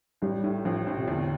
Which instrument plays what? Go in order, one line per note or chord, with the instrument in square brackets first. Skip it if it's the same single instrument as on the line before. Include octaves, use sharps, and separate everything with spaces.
[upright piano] A1 [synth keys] G3
[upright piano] A2
[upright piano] A1 [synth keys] F3
[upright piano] A1
[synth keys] C3
[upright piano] E2 [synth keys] D3